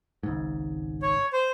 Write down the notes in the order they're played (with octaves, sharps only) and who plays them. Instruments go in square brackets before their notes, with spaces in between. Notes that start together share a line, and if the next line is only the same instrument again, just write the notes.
[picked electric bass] G#1 C#2 G#2
[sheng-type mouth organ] C#5
C5